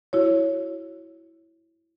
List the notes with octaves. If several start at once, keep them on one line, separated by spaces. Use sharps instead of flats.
E4 F#4 C#5